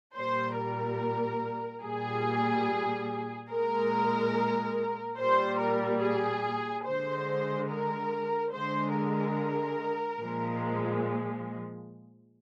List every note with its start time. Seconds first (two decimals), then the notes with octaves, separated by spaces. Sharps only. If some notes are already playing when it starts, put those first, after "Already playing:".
0.15 A#2 G3 C5
0.58 A#4
1.83 A#2 G3 G#4
3.50 A#2 G#3 A#4
5.17 A#2 G3 C5
5.60 A#4
6.02 G#4
6.85 D3 G#3 C5
7.69 A#4
8.53 D3 G#3 C5
8.95 A#4
10.20 A#2 F3 G#3